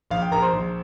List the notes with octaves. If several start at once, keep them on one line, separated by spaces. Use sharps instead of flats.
A#1 F5
G5
A#1 A#4 A#5
C5 C6
A#1